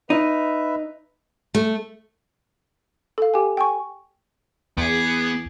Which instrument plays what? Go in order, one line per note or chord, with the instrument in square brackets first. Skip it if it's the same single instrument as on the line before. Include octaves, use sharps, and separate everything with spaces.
[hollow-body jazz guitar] D#4 [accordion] B4 E5
[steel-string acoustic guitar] A3
[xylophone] A4 F5
G4 G5 G#5
G5 G#5 C#6
[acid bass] E2 [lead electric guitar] B3 [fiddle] G#4 D6